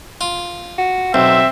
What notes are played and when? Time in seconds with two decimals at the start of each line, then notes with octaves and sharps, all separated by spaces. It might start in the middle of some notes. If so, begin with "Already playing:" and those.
0.21 F4
0.78 F#4
1.14 B1 C4 E5